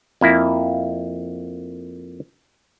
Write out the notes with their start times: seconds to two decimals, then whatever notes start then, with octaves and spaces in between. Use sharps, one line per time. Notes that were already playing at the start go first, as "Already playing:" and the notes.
0.21 F2 A#3 E4